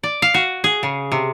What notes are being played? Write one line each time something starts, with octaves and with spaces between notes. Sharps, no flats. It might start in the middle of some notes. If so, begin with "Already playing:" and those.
D5
F5
F#4
G#4
C#3
C3